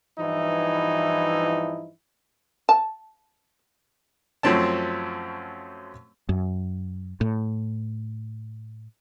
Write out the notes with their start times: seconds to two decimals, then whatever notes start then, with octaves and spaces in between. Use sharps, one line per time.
0.19 G2 E3 F3 D#4 E4
2.69 A5
4.43 F#2 F3 A3 C4 C#4 A5
6.29 F#2
7.21 A2